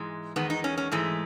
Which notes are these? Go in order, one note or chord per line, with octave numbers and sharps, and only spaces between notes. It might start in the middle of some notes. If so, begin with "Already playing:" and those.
Already playing: G#2 E3 G#3
E2 D#3 G#3 B3
D#4
C#4
C#4
G#2 E3 G#3 A3